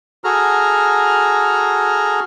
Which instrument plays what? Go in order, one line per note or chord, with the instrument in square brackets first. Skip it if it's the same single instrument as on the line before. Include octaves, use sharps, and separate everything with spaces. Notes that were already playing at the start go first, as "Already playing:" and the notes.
[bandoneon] F#4 G#4 A4 A#5 F6